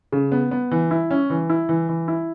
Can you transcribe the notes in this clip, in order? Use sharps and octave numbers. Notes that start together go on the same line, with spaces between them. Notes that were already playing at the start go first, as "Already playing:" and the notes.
C#3
B3
B3
E3
E4
C#4
E3
E4
E3
E3
E4